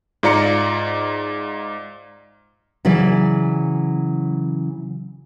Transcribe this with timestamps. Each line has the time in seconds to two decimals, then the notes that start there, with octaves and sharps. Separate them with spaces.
0.23 G#2 F4 D5 A#5 C#7
2.85 C#3 E3 F#3 D5 E5